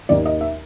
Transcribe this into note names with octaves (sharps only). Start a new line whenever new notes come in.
D#2 D#3 D5
D#5
E5